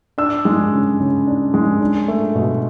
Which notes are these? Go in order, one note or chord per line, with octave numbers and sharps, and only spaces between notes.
D4 E6
G#3
C#3
C#3
D4
G#3
D4
A3
B2